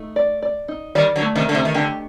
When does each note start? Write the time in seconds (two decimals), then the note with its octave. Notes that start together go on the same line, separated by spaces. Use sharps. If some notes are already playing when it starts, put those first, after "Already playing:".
Already playing: A3 D#4
0.16 D5
0.42 D5
0.68 D#4
0.95 D#3 G3 D5
1.16 D3 F#3
1.22 A3
1.35 C3 D#3
1.48 D3 A3
1.55 C3
1.65 D#3
1.74 D3 G4